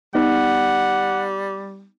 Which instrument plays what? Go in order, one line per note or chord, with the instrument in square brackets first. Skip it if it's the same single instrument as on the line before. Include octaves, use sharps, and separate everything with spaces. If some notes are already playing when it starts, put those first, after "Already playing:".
[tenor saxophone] G3 [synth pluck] B3 D#4 [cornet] F#5